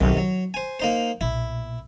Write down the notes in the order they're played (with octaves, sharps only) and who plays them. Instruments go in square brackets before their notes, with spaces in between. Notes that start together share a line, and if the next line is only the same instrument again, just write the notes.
[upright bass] B1 A2 [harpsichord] C3 D#3
[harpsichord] F#3 [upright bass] E4
[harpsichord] C5 G#5
A#3 D#4 C5
[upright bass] B1 A#2 [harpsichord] E4